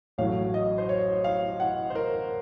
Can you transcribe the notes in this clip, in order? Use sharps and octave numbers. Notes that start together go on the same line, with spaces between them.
A1 A2 F#3 A3 F5
D#5
C5
C#5
F5
F#5
C5
A#4